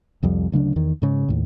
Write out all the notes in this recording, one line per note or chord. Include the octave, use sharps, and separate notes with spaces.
C2 F2 G3
D2 C#3 F#3 D4
E2 D#3
G#2 C#3
D#2 A2